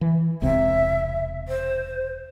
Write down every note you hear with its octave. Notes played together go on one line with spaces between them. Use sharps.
E3
E1 C2 C3 E5
C5